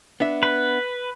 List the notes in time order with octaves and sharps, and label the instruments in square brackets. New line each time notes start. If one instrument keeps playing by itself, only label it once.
[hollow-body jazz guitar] B3 D4 E5
[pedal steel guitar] B4